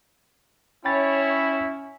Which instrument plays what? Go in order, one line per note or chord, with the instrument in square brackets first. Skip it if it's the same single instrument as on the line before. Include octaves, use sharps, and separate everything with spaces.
[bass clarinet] C#4 [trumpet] E4 [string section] C#5 [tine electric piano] G5 B5 A6